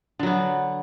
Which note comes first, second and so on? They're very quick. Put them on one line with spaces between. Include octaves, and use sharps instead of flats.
D3 F#3 B3